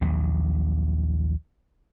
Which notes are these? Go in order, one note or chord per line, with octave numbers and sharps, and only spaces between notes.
A#1 D#2 F#3